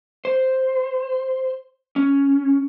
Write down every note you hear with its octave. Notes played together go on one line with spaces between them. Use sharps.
C5
C#4